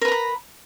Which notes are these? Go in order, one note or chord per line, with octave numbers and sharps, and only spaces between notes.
A#4 B4 A#5 B5